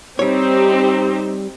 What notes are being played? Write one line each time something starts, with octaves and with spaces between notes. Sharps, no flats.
G3 C4 D#4 G4 C#5